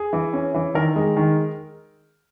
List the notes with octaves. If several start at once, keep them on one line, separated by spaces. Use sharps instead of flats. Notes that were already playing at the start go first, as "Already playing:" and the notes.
Already playing: G#4
E3
C#4
E3
D#3 A#4
G#3
D#3